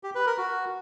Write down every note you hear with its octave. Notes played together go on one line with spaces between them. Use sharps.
G4
B4
A#4
F#4